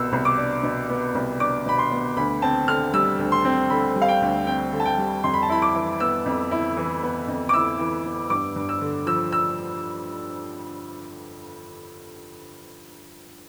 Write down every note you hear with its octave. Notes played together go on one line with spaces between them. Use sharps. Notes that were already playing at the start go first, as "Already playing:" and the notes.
Already playing: C2 B2 B3 E6
C2
D6
D4
B2
B3
C2
D4 D6
B2 B5
C6
B3
D2 B5
C4 A5
D3 F6
G3 E6
D2
C6
C4
D3 B5
G3
F5
G5
D2
C4 G5
D3
A5
G5
G3
F2 C6
B5
A5
E4 B5
D6
E3
B3 E6
F2
E4
E3
B3
F2
D6
E4 E6
E3
B3
G2 D6
G2
E6
D3
F3 E6
E6